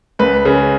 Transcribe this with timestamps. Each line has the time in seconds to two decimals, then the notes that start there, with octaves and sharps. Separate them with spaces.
0.19 C#2 B4
0.45 C#3